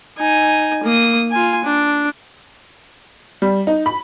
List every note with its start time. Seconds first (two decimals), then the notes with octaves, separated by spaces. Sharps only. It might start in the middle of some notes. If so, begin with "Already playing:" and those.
0.18 D#4 G#5
0.84 A#3 D#6
1.31 F4 G#5
1.65 D4
3.42 G3
3.67 D#4
3.86 B5